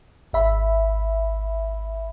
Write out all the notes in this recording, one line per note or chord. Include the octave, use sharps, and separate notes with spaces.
G#1 E5 B5